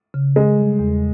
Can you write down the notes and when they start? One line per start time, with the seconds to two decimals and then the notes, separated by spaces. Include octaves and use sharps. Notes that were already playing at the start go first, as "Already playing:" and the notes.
0.14 C#3
0.36 C#3 G#3
0.58 G3
0.79 E2